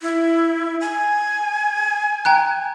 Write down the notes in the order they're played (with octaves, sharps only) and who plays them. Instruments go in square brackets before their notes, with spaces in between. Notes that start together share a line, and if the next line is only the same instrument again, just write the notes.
[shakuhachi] E4
G#5
[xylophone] G5 A#5 F#6